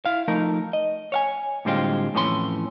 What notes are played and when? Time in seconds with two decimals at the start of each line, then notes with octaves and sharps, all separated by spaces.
0.06 E4 F5
0.28 F3 A3 D#4 A#4
0.73 D#5
1.12 C#5 F5 G#5
1.65 A2 D3 G3 G#3 C4 F4
2.14 F2 A2 E3 C#4 F4 C6